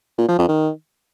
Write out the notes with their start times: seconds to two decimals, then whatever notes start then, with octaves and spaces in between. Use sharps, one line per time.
0.18 A#2
0.28 F3
0.38 F2
0.48 D#3